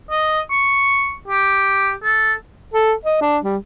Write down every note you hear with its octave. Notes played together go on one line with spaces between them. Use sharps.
D#5
C#6
G4
A4
A4
D#5
D4
G3